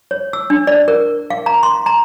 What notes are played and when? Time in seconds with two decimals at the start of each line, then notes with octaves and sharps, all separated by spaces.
0.11 C#5
0.33 E6
0.50 D4
0.67 D5
0.88 A#4
1.30 F5
1.46 A#5
1.63 C6
1.86 A#5